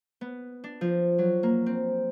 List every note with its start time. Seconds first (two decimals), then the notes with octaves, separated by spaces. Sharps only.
0.21 B3
0.64 D4
0.81 F3
1.18 F#3
1.43 A#3
1.66 C4